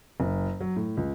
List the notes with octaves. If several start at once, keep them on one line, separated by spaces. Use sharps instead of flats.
F#1
F#3
A2
C#2